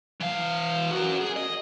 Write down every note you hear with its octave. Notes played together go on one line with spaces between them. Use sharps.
E3 F5
F#4 A#4
G#4
D#5